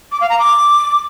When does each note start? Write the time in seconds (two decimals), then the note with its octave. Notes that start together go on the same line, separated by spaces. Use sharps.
0.12 D6
0.21 F5
0.30 A#5
0.39 D6